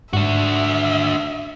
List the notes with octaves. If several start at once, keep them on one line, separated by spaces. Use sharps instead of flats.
G#2 D4 F#4 E5